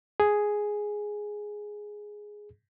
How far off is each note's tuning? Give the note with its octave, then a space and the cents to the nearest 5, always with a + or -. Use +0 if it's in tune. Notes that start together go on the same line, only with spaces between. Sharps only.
G#4 +0